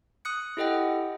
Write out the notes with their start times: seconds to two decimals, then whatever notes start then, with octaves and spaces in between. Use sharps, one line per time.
0.25 D#6 F#6 C#7
0.57 E4 G4 A4 D#5 F#5 G5